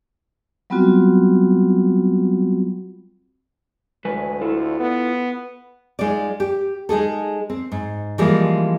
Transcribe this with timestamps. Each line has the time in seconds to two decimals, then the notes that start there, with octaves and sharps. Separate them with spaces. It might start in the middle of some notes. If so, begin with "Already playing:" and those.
0.70 F#3 G3 B3 C4 F4 F#4
4.05 D2 G#3 B4 G#5
4.41 E4 F4 A4
4.80 B3
5.99 G#3 D#4 F4 D5
6.40 G4
6.89 G#3 D#4 G#4 A4
7.50 C4
7.72 G#2
8.18 E3 F3 G3 G#3 A#3 F4